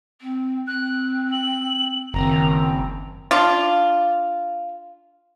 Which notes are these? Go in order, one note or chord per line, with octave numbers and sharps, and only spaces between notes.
C4
C4 F#6
F#7
F#1 D#3 C4 A#5
D4 F4